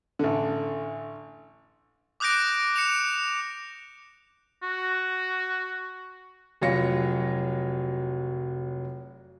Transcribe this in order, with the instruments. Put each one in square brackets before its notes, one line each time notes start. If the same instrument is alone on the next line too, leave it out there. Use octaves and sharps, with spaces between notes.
[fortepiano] A1 D3
[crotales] D6 D#6 F#6 G6 A#6 D7
C#7 E7 F7
[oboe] F#4
[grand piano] F1 F#3 F4 C#5 A#6 C#7